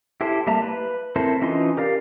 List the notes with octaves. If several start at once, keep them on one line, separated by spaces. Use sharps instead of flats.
E4 G4 A4 C5
G3 A#3 E5 A5 A#5
B4
C4 E4 A4 A#4 C5
E3 C#4 D#4 F4 C6
G4 A#4 D5 F5